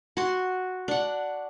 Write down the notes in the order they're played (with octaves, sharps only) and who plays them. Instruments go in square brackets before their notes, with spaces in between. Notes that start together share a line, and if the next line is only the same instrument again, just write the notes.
[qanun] F#4 C6
D4 F#5